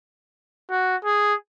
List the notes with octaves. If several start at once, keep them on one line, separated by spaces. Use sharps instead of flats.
F#4
G#4